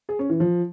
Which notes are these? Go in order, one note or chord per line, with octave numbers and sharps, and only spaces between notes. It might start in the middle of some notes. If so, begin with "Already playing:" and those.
G#4
C#4
E3
F3